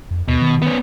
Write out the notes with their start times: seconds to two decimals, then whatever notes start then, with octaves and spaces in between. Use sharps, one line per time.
0.11 F2
0.28 D#2 B2
0.41 D#3
0.62 B3 C#4